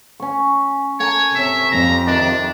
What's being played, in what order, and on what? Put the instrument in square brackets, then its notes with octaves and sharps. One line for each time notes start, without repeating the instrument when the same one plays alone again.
[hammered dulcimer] C#4 C#6
[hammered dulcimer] A4 A#4 G#5 [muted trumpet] C#5
[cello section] C3 C#5 [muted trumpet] E5
[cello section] F2 G4 [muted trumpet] A#5
[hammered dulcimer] C3 D#3 [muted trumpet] D4